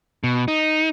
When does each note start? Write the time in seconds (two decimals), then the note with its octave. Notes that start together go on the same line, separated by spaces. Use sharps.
0.24 B2
0.48 D#4